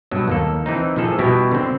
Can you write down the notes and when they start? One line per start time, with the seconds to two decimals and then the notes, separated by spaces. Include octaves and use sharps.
0.11 G2 B2 F#3
0.28 D#2 A#3 A4
0.66 E3 C4 D#4
0.96 A#2 E3 F3 G#4 A4
1.19 B2 G3 B3 D4 E4 G4
1.51 D3 C4